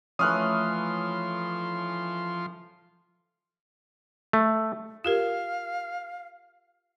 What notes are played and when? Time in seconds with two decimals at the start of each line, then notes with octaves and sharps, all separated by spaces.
0.19 E3 F3 A3 C#4 C6 D#6 F6 F#6
4.33 A3
5.04 F4 G4 A#4 F5